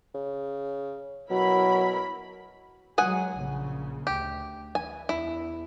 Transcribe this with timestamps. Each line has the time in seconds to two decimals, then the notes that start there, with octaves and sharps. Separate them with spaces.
0.15 C#3
1.31 B2 F#3 E4 A#4 B5
2.98 F#3 G#3 G#4 F#5 G#5
3.36 A#1 C#3
4.07 D2 G4
4.75 E3 G#5
5.09 E2 E4